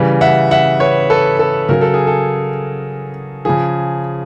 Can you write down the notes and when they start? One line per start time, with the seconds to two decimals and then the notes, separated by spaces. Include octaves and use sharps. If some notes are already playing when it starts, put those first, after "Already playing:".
Already playing: C#3 E3 G3
0.21 E5 F#5
0.51 E5 F#5
0.80 B4 C#5
1.10 A4 B4
1.39 A4
1.69 C#3 F#3 A#4
1.81 A4
1.94 G#4
2.07 A4
3.45 C#3 F3 G#4